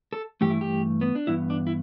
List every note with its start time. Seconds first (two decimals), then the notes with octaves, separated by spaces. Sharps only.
0.13 A4
0.41 G2 E3 A3 G4
0.50 E4
0.61 G4
1.01 B3
1.15 D4
1.27 G2 E3 B3 E4
1.50 D4
1.67 E4